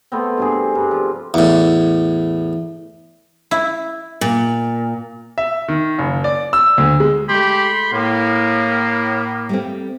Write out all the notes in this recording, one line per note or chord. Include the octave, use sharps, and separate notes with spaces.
A3 B3 C4
G2 C3 G#4
G2
F3
E2 A2
E4
A#2
E5
D#3
F#1
D5
E6
D2
G#3
G#3 A3 G4 B5 C6
A2 A#3
G3 A3 C4